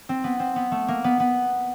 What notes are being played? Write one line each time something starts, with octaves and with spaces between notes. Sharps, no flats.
C4
B3
C4
B3
A3
A#3
B3
B3